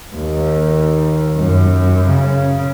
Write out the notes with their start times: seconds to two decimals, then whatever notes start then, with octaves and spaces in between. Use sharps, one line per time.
0.16 D#2
1.38 F#2
2.08 C#3